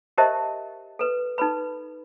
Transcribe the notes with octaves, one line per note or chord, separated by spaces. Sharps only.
G4 A#4 C5 D#5 E5 A5
A4 B4
D#4 A4 B4 B5